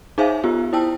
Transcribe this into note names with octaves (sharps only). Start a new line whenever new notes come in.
D#4 G#4 C5 E5 F5 G#5
B3 F4 G4
E4 C5 G5 A5 E6